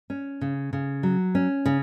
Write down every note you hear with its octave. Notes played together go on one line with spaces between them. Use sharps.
C#4
C#3
C#3
F#3
C#4
C#3